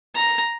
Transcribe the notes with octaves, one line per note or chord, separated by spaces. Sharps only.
A#5